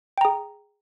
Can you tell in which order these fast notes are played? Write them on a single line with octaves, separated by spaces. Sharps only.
G5 A#5 G#4